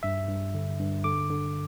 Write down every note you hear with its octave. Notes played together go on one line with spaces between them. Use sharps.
G2 E5
G2
D3
G2
D3 D6
D3